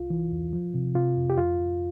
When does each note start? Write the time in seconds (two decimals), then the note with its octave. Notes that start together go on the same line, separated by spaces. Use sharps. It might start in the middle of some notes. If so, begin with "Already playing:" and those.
Already playing: C2 F4
0.10 E3
0.32 E2
0.53 F3
0.74 C3
0.95 C3 F4
1.16 F2
1.30 G4
1.37 F2 F4
1.59 F2